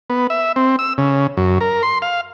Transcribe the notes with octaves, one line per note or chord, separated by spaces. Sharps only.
B3
E5
C4
E6
C#3
F#2
A#4
C6
F5